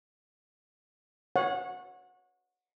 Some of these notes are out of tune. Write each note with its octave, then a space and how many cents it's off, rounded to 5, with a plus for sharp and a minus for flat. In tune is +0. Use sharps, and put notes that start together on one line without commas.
C#5 +0 F#5 -20